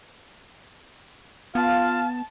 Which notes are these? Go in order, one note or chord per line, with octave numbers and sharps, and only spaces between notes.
B3 F4 F5 A5